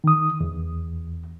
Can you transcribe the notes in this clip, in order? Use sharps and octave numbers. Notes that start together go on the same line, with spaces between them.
D#3 D#6
E2